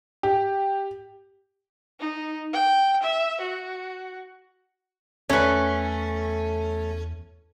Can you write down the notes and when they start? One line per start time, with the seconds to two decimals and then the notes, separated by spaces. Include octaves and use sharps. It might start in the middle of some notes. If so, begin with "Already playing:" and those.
0.23 G4
2.00 D#4
2.53 G5
3.03 E5
3.41 F#4
5.29 E2 A3 C#4 B4 C#5